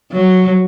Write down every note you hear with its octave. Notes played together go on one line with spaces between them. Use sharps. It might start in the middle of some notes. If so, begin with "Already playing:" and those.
F#3